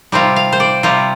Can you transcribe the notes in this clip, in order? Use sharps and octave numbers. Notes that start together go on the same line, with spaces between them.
C3 G3 C4 F4
F5
C5
D5
C3 G3 C4 F4